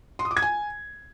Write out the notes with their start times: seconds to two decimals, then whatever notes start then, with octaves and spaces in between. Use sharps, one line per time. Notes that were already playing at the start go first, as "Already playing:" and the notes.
0.19 C6
0.25 D#6
0.31 D6
0.37 G#6
0.42 G#5